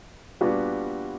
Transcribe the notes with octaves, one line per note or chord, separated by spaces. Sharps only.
A#2 G3 B3 D4 F#4